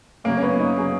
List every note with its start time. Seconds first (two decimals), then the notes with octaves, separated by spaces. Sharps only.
0.24 F#2 C#3 F#3 A#3
0.37 C#4
0.42 B3
0.59 D#4
0.78 C#3 F#3 G#4